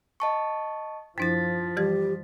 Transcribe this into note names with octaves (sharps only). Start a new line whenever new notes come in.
D#5 A5 C#6
F#2 F3 D4 E4 A6 B6
E3 G3 G4 G#6